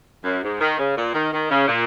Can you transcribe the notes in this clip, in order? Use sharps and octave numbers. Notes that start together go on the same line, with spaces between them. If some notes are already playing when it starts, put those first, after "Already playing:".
F#2
G#2
D#3
C#3
A#2
D#3
D#3
C#3
A#2